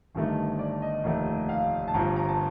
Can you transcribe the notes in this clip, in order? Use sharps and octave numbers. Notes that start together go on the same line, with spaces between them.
G1 G2 D#3 A3
D5
D#5
F1 D#2 D#3 A3
F5
A5
G1 G2 F3 A#5
A#5
A5